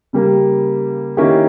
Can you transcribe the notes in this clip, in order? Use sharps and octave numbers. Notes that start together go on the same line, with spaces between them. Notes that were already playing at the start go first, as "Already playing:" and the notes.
C#3 G3 A#3
D#3 A#3 C#4 E4 G4